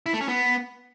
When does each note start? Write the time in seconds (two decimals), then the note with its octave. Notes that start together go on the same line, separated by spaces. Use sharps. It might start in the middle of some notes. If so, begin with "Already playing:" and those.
0.06 E4
0.13 A3
0.21 C#4
0.28 B3